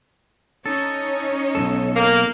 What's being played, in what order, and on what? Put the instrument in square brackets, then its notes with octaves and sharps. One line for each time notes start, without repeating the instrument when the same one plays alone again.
[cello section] C#4 D#4 C#5 [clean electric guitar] A4
[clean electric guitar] B1 G#2 A4
[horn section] A#3